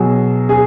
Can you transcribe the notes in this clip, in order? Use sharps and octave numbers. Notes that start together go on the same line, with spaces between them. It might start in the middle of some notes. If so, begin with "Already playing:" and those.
Already playing: B2 F#3 G#4
G#4